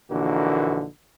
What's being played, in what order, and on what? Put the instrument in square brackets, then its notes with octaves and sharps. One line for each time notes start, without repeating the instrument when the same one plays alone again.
[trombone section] A#1 D3 E3 A#3 D#4 F#4